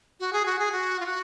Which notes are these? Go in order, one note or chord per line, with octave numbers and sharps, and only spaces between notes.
F#4
G#4
F#4
G#4
F#4
F4
F#4